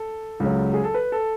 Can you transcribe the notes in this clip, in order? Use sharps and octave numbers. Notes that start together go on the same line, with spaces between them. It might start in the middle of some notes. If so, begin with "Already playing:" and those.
Already playing: A4
C#2 C#3 F#3
G#4
A4
B4
A4